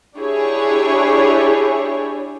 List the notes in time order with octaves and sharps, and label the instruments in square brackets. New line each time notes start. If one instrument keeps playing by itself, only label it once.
[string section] D4 E4 G4 G#4 C#5